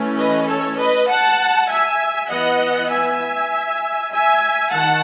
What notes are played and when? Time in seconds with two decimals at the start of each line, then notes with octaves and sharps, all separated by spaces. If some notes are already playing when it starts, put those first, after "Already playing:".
Already playing: E3 A3 C#4
0.19 B4 D#5
0.48 A4 C#5
0.79 B4 D#5
1.09 F#5 A5
1.69 E5 G#5
2.30 E3 B3 D#5 F#5
2.91 E5 G#5
4.12 E5 G#5
4.72 D#3 F#5 A5